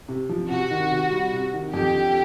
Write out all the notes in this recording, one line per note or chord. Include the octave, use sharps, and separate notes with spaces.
C3
F3
C3 F#4
D#3
C3
G3
C3
D#3
F2 G4
D3